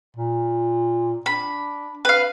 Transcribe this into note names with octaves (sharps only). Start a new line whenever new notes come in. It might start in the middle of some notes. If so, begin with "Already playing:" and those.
A#2
D4 B5
B4 F5